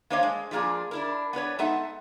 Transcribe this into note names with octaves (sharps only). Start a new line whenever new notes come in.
A#3 D4 C5 C#5 D#5 F5
G#3
F3 G#3 A#3 D4 G#4
D4 E4 A#4
B3 D4 B4 C#5
G#3 B3 D#4 A4 E5 F#5